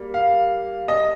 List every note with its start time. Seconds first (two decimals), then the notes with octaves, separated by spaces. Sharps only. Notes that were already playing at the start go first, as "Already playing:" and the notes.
Already playing: G3 A#3
0.14 F5
0.88 D#5